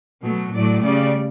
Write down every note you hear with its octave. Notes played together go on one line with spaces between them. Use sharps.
B2 F#3 A3
A2 F#3 A3 D5
C#3 G3 D5